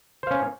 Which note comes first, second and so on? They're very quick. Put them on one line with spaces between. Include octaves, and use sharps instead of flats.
C5 F5 C#4